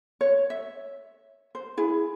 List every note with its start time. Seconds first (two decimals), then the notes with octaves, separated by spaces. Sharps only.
0.21 C#5
0.50 E5
1.55 C5
1.77 E4 G#4